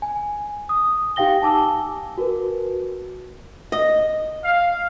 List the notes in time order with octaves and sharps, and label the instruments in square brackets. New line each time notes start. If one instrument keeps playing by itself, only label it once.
[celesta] G#5
D#6
D#4 G4 F5 G5 A#6 G7
G#5 A5 D6 E6
F#4 A#4 B4
[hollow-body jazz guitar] D#5
[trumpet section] F5